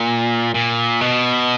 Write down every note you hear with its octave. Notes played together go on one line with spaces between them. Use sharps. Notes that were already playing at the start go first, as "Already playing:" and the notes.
Already playing: A#2
A#2
B2